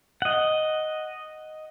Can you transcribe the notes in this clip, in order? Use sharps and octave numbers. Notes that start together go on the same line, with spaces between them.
D#5 F#5